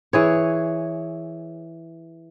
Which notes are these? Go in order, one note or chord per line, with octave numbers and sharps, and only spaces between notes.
E3 G#4 C#5